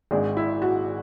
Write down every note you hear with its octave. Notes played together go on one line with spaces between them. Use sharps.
G#1 G#2 G#3 D4
E4
F#4